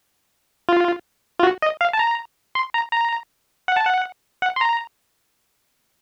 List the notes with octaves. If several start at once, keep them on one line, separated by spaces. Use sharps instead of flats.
F4
F4
F#4
D#5
F5
A5
A#5
C6
A#5
A#5
F#5
A5
F#5
F#5
C6
A#5